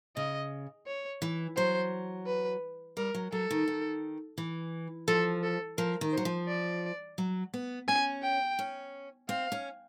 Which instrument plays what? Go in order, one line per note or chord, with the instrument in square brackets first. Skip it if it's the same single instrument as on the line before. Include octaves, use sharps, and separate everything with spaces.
[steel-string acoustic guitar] C#3 [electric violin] D#5
[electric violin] C#5
[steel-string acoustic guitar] E3
[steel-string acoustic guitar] F#3 [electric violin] C5
[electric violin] B4
[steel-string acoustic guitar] G3 [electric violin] A#4
[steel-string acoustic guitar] F#3
[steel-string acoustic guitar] F#3 [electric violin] A4
[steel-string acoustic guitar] D#3
D#3
E3
[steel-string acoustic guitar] F3 [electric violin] A4
[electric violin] A4
[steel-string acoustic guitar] F3 [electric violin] A#4
[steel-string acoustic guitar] D#3
[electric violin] C5
[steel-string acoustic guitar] F#3
F3
[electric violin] D5
[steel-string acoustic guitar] F#3
B3
[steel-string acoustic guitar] C#4 [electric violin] G#5
[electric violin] G5
[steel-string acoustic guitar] C#4
[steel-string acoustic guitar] C4 [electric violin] F5
[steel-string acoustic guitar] C#4